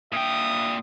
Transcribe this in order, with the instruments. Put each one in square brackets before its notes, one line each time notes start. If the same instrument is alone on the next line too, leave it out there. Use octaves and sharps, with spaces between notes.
[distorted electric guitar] A#2 G5 [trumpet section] D4 E5 D#6